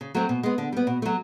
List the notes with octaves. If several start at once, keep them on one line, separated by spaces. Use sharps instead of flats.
C#3
F#3 A3 C4
B2
G#3 B3
D3
G3 B3
B2
F#3 A3